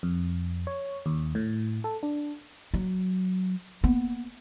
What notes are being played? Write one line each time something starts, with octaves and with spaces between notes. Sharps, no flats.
F2
C#5
D#2
A2
A4
D4
F#3
A#3 B3